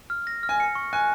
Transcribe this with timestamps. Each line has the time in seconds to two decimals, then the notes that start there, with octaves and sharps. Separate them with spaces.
0.10 F6
0.27 A#6
0.43 F6
0.49 G#5
0.60 C#7
0.75 C#6
0.93 G#5 F#6